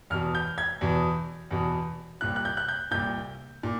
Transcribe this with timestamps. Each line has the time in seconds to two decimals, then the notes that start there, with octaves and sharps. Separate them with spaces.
0.10 E2 B2 F6
0.35 G6
0.58 G#6
0.81 E2 B2
1.51 E2 B2
2.21 C2 A#2 F#6
2.36 F#6
2.45 G6
2.57 F#6
2.69 G6
2.91 C2 A#2 G6
3.63 A#2